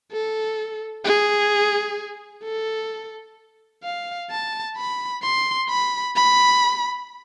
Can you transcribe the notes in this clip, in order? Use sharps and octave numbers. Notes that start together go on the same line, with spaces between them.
A4
G#4
A4
F5
A5
B5
C6
B5
B5